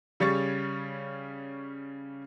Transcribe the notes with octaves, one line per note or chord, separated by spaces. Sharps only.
C#3 G3 C#4 C#5 C#6 A6